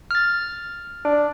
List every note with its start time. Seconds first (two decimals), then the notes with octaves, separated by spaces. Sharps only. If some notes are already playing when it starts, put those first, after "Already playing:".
0.11 F6 A6
1.05 D4